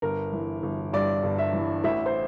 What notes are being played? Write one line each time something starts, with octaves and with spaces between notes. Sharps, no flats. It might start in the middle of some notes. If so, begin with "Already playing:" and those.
G1 A#4
E3
G1
G2 D5
G1
E5
E3
A1 E5
C5